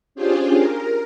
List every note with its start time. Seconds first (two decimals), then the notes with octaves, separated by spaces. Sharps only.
0.15 C#4 D4 F4 G4 G#4 C5
0.56 A#4